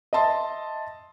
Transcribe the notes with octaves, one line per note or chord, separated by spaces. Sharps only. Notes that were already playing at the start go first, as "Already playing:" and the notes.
D#5 E5 A5 C6